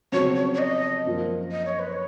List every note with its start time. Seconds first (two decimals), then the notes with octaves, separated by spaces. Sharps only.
0.12 F2 C#3 F#3 B3 C#5
0.36 C#5
0.54 C#5
0.59 D#5
1.05 F#2 F3 A#3
1.52 D#5
1.66 C#5
1.79 B4
1.93 C#5